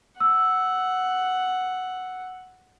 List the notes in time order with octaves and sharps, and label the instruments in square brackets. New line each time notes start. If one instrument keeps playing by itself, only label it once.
[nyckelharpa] F#5 [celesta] E6